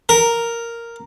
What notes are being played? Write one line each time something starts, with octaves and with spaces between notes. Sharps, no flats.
A#4